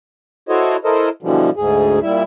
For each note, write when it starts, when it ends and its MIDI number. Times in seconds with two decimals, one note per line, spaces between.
0.49 0.77 64
0.49 0.77 66
0.49 0.77 69
0.49 0.77 72
0.49 0.77 73
0.49 0.77 75
0.85 1.09 64
0.85 1.09 69
0.85 1.09 70
0.85 1.09 72
0.85 1.09 75
1.23 1.50 47
1.23 1.50 50
1.23 1.50 52
1.23 1.50 53
1.23 1.50 55
1.57 1.99 38
1.57 1.99 44
1.57 1.99 68
2.02 2.23 46
2.02 2.23 55
2.02 2.23 64
2.02 2.23 76